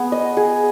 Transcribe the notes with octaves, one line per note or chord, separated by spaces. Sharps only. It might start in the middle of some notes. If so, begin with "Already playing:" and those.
Already playing: B3 G#4
D#5
G#4